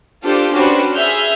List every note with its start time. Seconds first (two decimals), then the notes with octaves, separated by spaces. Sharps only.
0.23 D4 F4 G4 A4 C5
0.53 C#4 D4 F#4 G4 B4 C5
0.96 G#4 E5 F6 G6